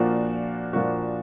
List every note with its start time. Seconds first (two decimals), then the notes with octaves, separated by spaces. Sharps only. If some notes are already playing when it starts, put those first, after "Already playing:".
Already playing: A#2 F3 A#3 D4 F#4
0.73 A#2 F3 A#3 D4 F#4